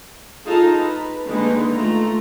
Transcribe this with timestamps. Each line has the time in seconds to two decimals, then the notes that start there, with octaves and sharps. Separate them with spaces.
0.45 D#4 F4 G#4 A4 A5 A#5
0.77 B4
1.28 D3 D#3 G#3 A#3 D#4 B4
1.72 A3 F4 A#5